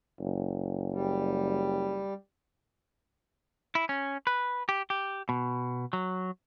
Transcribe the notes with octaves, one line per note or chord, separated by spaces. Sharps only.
F#1
G3
E4
C#4
B4
G4
G4
B2
F#3